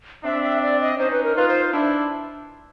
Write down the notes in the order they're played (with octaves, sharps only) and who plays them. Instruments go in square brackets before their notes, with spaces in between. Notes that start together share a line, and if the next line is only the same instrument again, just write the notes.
[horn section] C4 D4 [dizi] E5
[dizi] E5
D5
D#5
[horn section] C#4 D#4 [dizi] C5
[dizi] B4
A#4
[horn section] D#4 F4 [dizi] B4
[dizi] C5
[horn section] D4 E4